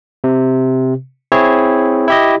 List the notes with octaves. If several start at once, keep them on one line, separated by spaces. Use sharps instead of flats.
C3
C4 E4 G#4 C#5
E4 G4 D#5